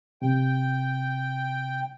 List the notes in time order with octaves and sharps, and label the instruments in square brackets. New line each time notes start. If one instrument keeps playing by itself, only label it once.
[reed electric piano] C3 [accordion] G5